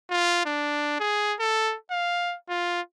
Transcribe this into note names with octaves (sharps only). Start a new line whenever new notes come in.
F4
D4
G#4
A4
F5
F4